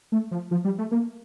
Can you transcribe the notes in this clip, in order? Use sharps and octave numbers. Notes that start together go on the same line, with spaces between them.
A3
F3
F3
G3
A3
A#3